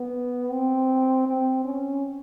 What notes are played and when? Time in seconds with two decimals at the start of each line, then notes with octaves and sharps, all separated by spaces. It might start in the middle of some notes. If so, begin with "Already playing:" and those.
Already playing: B3
0.51 C4
1.27 C4
1.65 C#4